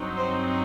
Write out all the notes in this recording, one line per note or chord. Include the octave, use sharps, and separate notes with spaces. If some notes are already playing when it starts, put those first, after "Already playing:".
Already playing: G2 F#3 C4 D#4
C5